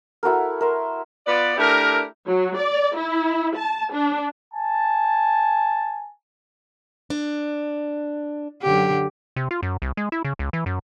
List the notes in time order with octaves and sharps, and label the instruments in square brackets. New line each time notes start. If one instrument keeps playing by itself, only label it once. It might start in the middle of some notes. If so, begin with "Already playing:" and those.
[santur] E4 F#4 A4 A#4
A#4 E5 C6
[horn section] B3 F4 B4 D5
A3 D4 E4 G4 A#4
[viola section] F#3
D5
E4
A5
D4
[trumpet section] G#5 A5
[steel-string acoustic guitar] D4
[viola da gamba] F#2 D3 G4
[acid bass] C3
F4
F#2
C2
G#3
E4
C#3
C#2
E3
F#2